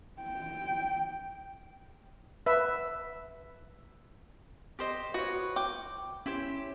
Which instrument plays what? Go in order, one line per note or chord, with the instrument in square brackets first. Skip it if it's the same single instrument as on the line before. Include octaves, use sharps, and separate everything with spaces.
[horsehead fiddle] G5
[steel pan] B4 E5
[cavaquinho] G4 C5 D#5
[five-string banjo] F#4 [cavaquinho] B4 C#5
[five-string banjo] G5 [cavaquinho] D6
[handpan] C#4 [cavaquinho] E4 G4 C5